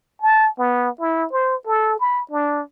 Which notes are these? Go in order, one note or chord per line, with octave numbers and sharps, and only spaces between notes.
A5
B3
E4
C5
A4
B5
D4